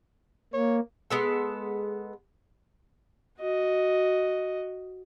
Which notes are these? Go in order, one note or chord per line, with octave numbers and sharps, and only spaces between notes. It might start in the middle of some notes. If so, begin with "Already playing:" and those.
A#3 C#5
G#3 B3 A4
F#4 D#5